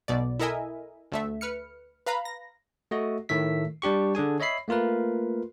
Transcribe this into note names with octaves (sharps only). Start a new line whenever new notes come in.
B1 B2 D5
E4 A4 A#4 D#5 E5 G#5
D2 A3 E5
B4 F6 C#7
B4 F5 A#5 B5
A#6
A3 F#4 D#5
A2 D#3 A3 E5 B6
G3 D4 G4 C#6
D3 D4 G#4 G#5
C#5 D#5 E5 B5 C7
A3 A#3 F4 A#4 B4